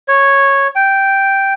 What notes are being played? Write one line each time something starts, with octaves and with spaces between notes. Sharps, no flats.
C#5
G5